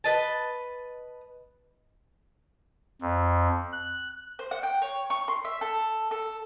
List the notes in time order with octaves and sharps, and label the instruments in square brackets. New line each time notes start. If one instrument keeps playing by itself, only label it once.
[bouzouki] B4 D#5 A5
[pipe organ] F2
F#6
[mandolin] C5
F#5
G5
C#5
C#6
C6
E5
A4
A4